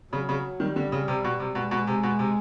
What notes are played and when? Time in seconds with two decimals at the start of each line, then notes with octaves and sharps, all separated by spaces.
0.13 C#3 F#3
0.29 C#3
0.60 D#3 G3
0.76 D3
0.92 C#3
1.08 C3
1.24 B2
1.40 C3
1.55 B2 G#3
1.71 B2
1.87 C3
2.03 B2
2.19 C3